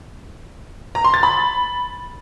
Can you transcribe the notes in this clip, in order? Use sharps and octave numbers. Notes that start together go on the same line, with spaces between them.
A#5
C6
A6
B5